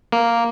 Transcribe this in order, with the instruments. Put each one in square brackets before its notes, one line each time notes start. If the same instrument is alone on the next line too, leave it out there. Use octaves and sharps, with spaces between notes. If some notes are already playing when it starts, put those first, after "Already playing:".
[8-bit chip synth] A#3